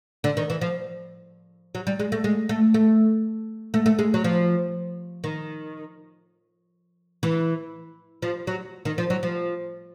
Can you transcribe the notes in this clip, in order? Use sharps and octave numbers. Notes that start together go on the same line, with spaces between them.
D3
D#3
E3
F3
F#3
G3
G#3
A3
G#3
A3
A3
A3
A3
G#3
F#3
F3
D#3
E3
F3
F#3
D#3
F3
F#3
F3